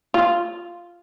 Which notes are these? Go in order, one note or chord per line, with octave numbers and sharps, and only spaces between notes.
F4